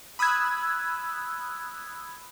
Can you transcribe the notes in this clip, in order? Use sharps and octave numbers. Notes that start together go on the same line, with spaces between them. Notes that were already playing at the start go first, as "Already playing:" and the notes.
B5 D#6 E6 F#6 G#6